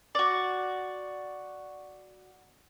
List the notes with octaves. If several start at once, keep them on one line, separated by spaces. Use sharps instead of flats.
F#4 D5